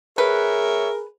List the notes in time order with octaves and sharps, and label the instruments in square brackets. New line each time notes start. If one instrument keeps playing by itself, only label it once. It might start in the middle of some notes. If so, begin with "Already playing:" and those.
[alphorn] G#4 [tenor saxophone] A#4 [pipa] B4 [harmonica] C#5 E5